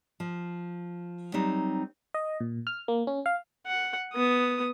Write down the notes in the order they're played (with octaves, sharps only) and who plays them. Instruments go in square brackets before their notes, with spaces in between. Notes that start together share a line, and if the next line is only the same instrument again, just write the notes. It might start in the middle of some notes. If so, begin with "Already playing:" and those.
[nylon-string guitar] F3
F#3 G3 C4 D#4
[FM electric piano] D#5
A#2
F6
A#3
C#4
F5
[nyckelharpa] F#5
B3 D#6